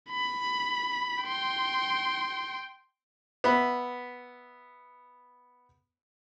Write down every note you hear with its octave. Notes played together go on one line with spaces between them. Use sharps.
B5
G5 C6
B3 E5 B5